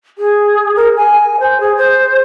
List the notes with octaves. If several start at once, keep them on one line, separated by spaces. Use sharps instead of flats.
G#4
A#4
G#5
C5
G#4
C5